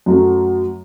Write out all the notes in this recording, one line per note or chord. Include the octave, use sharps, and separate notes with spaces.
F#2 F#3 A3